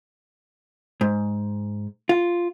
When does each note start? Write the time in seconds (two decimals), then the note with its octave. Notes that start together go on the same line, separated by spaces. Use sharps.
1.01 G#2
2.09 F4